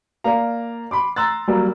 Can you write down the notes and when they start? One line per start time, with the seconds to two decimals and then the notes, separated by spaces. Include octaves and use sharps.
0.24 A#3 D5 F5 A#5
0.91 B5 C6 D6
1.16 A#5 C6 E6 F#6 A6
1.48 F#3 G3 A#3